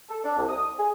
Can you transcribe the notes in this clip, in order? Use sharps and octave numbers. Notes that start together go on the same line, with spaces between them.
A4
D4
C2
D#6
G#4